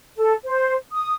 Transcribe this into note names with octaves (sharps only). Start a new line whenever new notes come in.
A4
C5
D#6